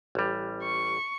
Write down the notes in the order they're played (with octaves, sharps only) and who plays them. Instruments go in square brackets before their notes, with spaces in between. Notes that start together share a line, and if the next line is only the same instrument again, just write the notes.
[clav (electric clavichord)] A1 G3
[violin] C#6